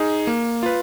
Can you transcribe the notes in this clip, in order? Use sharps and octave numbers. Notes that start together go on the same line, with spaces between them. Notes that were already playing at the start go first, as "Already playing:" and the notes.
Already playing: D#4 G#4
A#3
F4 B4